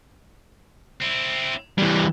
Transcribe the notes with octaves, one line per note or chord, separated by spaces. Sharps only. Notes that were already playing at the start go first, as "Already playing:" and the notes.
C4 E4
E2 E3 G3